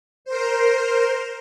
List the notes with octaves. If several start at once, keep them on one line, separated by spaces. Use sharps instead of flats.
A#4 C5